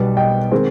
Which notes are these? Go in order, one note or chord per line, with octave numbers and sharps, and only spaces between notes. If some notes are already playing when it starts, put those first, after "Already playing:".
Already playing: B1 B2 G3 B3
D#5 G5
D#3 G#3 C4